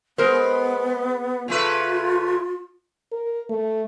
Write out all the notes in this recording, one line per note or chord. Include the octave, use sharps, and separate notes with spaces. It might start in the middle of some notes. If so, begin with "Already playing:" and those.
G#3 B3 A#4 C5
C#3 A3 F4 B4
A#4
A3